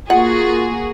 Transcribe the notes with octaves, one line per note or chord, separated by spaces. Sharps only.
A#3 F4 F#4 G#4 F#5